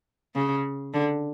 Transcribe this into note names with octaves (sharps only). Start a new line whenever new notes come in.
C#3
D3